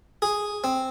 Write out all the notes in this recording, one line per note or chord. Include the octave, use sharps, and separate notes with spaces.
G#4
C4